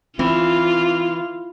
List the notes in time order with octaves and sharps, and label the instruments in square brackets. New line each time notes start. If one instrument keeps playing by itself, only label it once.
[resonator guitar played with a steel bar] E3 [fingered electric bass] C4 [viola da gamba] F4